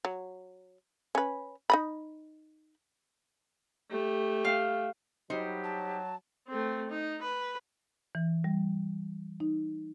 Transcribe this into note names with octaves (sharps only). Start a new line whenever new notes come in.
F#3
C#4 B4
D#4 D#5 B5
A3 G4
F5
F#3 G3 D#4 G4 C5
A5
A3 C4
D#4
B4
E3
G3
D#4